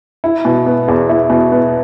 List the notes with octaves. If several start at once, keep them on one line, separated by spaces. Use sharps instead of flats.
E4
B2
B3
E2
E4
B2
B3